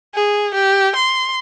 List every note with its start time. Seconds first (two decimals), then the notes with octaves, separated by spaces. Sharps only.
0.14 G#4
0.55 G4
0.96 C6